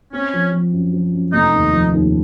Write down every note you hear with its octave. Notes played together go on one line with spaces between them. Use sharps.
C4 C#4
F3
F3
F#2
F3
F#2
F1 D#4
D#2
F3
D#2